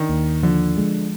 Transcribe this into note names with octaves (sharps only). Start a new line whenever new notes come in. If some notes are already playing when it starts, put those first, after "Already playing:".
Already playing: D#3 D4
D#2
D3 F3
G#3